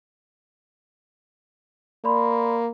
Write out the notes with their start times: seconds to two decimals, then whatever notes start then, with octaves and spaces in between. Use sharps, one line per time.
2.05 A#3 D5 B5 C6